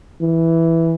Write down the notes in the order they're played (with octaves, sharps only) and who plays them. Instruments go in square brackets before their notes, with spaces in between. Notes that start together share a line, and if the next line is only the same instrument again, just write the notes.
[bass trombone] E3